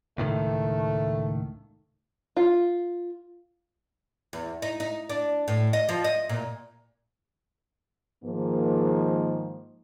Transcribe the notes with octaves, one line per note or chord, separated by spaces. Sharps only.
C#2 A2 D#3 A3
F4
E2
D#4
D#4
D4
A2
D#5
F3
D#5
A#2
G#2 D#3 F3 G#3 A#3